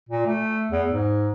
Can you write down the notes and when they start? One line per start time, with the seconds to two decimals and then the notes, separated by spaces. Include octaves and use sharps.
0.09 A#2
0.26 A3
0.71 E2
0.90 G#2